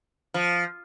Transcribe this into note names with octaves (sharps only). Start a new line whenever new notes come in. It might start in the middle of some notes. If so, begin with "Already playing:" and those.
F3